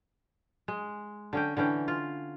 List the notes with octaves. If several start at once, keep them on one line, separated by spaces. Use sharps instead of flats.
G#3
D3 C#4 G5
D3 E3 C#4 G5
F4